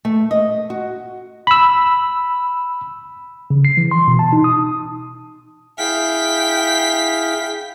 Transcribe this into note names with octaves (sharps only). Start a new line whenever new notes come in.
A3
D#5
F#4
B5 E6
C#3
C7
E3
C6
B2
A5
D#4
D#6
E4 G#4 F5 G5 B6